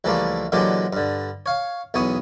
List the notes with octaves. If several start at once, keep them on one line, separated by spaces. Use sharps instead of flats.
C#2 E3 F3 G3 A3 A#3
A#2 D3 E3 F#3 G#3 G4
G2 D3
C#5 F5
B1 E2 B3 C#5 D#6